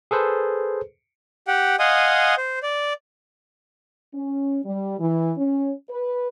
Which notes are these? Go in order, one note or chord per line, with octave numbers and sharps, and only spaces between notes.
G#4 A4 B4 C5
G4 F#5 G5
D#5 F5 F#5 G#5 C6 D#6
C5
D5
C#4
G3
E3
C#4
B4